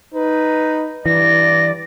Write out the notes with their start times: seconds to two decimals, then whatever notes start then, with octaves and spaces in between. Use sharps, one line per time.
0.14 D#4 B4
1.06 G2 E3 D5 A#6